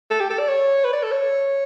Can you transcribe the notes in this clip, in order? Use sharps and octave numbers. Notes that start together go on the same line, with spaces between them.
A4
G4
A4
D5
C#5
B4
D5
A4
C#5